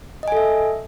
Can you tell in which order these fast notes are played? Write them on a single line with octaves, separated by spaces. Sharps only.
D#5 G#5 A4 E5